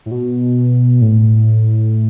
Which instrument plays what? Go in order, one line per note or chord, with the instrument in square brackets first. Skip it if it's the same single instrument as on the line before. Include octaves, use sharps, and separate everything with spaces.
[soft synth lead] A2
B2
A2